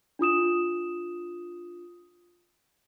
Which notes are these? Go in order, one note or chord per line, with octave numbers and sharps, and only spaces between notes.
D4 F4 D#6 E7